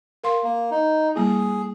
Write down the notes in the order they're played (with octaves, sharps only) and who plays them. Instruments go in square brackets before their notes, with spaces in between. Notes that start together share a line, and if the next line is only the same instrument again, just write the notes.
[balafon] A#4 F5 C6
[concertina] A#3
D#4
[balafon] G3 A#3 E4 [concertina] G#4